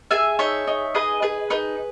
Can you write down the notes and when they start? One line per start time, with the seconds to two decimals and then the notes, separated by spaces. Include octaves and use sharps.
0.11 G#4 E5 G#5
0.39 D#4 C#5 E5
0.67 D#4
0.94 G#4 B4 D#5
1.22 G#4 B4
1.50 D#4 B4